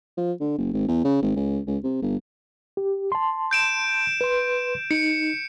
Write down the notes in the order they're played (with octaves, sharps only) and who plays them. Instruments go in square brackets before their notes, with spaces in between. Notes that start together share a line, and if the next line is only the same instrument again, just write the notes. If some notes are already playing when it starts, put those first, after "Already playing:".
[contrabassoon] F3
D3
F#1
G#1
E2
C#3
G#1
C#2
C#2
C3
G1
[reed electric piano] G4
A5 C6
[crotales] G6 D7 E7
[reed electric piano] B4 C6
[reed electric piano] D#4 [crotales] C#7